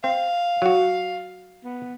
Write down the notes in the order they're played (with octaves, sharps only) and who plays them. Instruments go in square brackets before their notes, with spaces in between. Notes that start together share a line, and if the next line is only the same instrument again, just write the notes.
[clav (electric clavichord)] C4 [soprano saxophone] F5
[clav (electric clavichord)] F#3 F#4
[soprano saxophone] B3